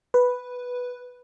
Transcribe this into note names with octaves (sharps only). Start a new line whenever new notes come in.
B4